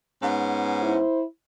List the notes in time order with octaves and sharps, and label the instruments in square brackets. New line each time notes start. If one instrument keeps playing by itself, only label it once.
[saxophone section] G#2 B3 C#4
[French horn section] E4 C5